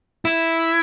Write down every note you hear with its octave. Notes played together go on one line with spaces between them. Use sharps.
E4